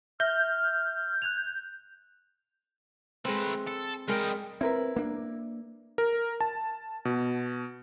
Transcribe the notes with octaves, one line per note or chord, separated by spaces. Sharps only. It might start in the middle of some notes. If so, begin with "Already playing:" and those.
E5 F6 G6 A#6
F#6 G#6 F7
G#3 A3 C4 B4
A4
G3 G#3 A#4 D#5 G5
C4 E4 A#4 B4
A#3 D4
A#4
A5
B2